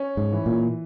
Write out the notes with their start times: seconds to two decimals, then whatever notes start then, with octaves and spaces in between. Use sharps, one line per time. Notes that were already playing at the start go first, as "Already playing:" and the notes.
Already playing: C#4
0.17 G#2
0.33 E3
0.46 A#2